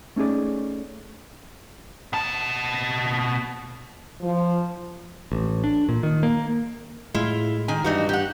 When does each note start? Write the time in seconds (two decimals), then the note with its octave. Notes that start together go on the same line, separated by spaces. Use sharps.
0.16 A3 C#4 D#4 G#4 D5
2.13 B2 A5
4.21 F3
5.32 A1
5.64 D4
5.89 A#2
6.03 D#3
6.23 A#3
7.14 A2 G#3 E4 F4
7.68 D#3 G#5
7.84 G2 E3 D#4 F#4
8.09 G4 F#5